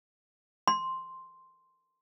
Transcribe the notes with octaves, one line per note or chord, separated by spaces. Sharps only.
C6